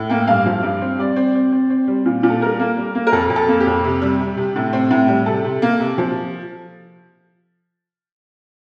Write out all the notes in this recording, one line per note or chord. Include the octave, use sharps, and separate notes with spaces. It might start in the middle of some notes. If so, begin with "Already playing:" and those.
Already playing: A2
A#3 G5
G2 F5
F3
G2
C4
G3 D5
C4
C4
C4
C4
G3
A#2
A#2
A4
G3 A#4
A#3
G3
A#3
A#4
F2 A4
F2
A4
A#3
G4
F2
C3
G3
C3
C3
A2
C4
A2
G3
C3 A4
C3
A#3
C3
F3